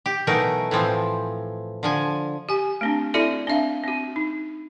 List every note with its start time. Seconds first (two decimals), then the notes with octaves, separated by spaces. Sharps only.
0.06 G4
0.27 B2 E3 F#3 A3 D#4 A#4
0.71 A2 E3 F3 C4
1.83 D3 F3 G#5
2.49 G4 G#5
2.81 A3 C4 D4
3.14 C4 E4 F#4 A4 D5 E5
3.47 C4 D4 E5 F5
3.84 C4 F#4
4.16 D#4